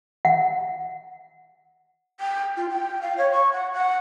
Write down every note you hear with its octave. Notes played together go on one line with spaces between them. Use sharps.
F#5
G5
F4
G5
F5
C#5
C#6
F#5
F#5